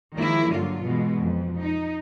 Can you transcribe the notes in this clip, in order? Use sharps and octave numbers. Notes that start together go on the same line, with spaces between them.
D#3 F3 G#3 A#3 E4
G2 D3 F#3 F4
B2 E3 G#3
F2
D#4